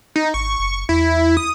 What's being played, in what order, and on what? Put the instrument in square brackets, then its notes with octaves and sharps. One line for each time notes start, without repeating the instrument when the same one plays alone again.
[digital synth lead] D#4
[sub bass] G#1 [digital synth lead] C#6
[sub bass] F#1
[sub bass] E2 [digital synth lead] E4
[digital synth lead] D#6